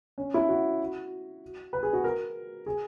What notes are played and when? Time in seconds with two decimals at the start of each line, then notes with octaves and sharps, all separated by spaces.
0.18 C#4
0.34 E4
0.49 F#4
1.73 B4
1.83 G#4
1.93 F#4
2.04 A#4
2.66 G#4